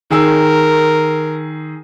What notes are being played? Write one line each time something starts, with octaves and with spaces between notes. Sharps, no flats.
D#3 G#4 A#4 E6